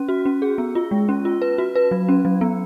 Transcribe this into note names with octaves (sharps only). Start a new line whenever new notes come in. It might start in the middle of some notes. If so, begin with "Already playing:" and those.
Already playing: C#4
F#4
C#4
G#4
B3
F4
G#3
C#4
F4
B4
F#4
B4
F#3
C#4
F#3
B3